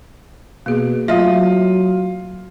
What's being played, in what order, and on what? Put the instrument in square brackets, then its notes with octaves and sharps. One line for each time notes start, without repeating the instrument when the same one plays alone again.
[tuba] B2 [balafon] A#3 G#4
[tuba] F#3 [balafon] A3 D#5 E5 [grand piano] F4